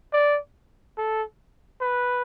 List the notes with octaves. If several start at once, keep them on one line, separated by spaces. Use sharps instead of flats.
D5
A4
B4